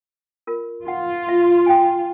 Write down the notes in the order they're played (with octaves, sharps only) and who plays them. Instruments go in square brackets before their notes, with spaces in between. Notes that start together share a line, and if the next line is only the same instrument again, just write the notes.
[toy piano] F4 A#4
[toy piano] D#4 F#5 [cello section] F4
[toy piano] E5
G5 G#5